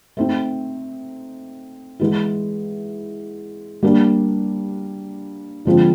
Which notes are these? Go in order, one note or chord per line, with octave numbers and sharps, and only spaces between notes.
A3 C4 D#4
E3 G#3 B3 E4
G3 A#3 D4
D3 F3 G#3 C4 F4